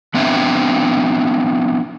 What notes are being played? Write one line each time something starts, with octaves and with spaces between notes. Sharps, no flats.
F3 B3 C4 D4 E5 G5